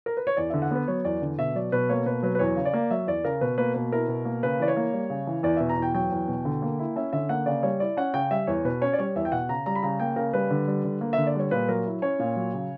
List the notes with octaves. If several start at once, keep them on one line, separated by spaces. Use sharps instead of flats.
A#4
B4
C#5
E2 D5
D3 E5
F#5
B3 B4
F#3 C#5
E2 D5
D3
B2 E5
F#3 D5
B2 B4
A#3 C#5
B2 B4
F#3 B4
B4
E2 C#5
C#3
D5
A#3
F#3 E5
E2 D5
C#3 A#4
B2 B4
A#3 B4
B2 B4
E4 A#4
B2
A#3
C#3 B4
E3 D5
C#5
A#3
G3
C#3
E3
E2 D5
B2 E5
A#5
E2
G5
F#3 G5
E2
B2
D3
A#3
E4
C#4 E5
D3 E5
A#3 F#5
C#3 D5
G3 C#5
E4 D5
C#4 F#5
C#3 G5
G3 E5
E2 C#5
B2 B4
C#4 C#5
D5
G3 C#5
E2 E5
G5
B2 F#5
C#3 A#5
G3 A#5
B5
C#3 A#5
A#3 G5
C#3 A#4
G3 B4
D3
G3
D3
A#3
E5
D3
D5
G3 C#5
A#2 B4
F#3 A#4
E4
C#4 C#5
A#2
F#3
C#3